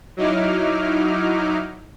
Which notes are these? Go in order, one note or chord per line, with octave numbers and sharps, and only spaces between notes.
F#3 D#4 E4 D6 F6